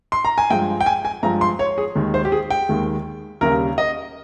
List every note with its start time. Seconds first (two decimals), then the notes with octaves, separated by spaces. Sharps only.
0.12 C6
0.25 A#5
0.38 G#5
0.50 G2 F3 G#3 G5
0.81 G5
0.86 G#5
1.05 G#5
1.23 G2 F3 G#3 A#5
1.41 C6
1.59 C#5
1.78 G#4
1.95 D#2 D#3 G#3
2.14 C5
2.25 G4
2.32 G#4
2.51 G5
2.69 D#2 D#3 G#3
3.41 D#2 C#3 G3 A#3 A#4
3.78 D#5